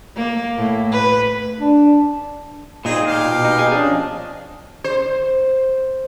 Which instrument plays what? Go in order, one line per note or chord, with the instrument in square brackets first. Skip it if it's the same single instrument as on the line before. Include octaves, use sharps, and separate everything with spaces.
[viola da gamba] A#3
A2
B4
[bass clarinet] D4
[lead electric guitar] A#2 D#4 [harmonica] C4 G#4
[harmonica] G4 F5
[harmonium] B2
[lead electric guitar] D#4
G#4
[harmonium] F3 C#4 D#5 [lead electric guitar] D4
[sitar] C5